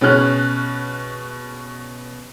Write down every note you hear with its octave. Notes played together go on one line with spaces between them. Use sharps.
B2 C#4 G#4 F6 F#6